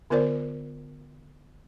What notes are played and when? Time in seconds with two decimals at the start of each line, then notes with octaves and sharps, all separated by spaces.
0.10 D3 B3 F4 A#4 C5 D5